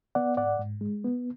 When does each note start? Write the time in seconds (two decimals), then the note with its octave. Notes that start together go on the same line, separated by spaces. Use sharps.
0.15 B3 D5 F#5
0.37 G#2 D5 F#5
0.59 G#2
0.81 G#3
1.04 B3